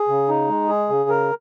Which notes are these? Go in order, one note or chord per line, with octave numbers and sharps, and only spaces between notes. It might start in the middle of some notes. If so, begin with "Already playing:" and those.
Already playing: G#4
C#3
D#4
G#3
G#4
C#3
A#4